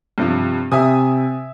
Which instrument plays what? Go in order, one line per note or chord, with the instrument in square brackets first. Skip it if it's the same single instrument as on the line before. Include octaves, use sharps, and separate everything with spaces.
[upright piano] G2 C3 F3
[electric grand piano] C3 [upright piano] E5 G#5 D#6